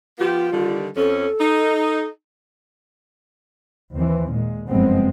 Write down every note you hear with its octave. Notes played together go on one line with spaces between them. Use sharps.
F3 B3 F4 G4
D3 D#3 G3
F2 C#4 A4
D#4
D#2 E3 C4
A#2 G#3
F#1 G2 F3 G#3 B3 C4